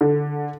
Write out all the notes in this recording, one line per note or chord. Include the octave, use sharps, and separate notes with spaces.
D3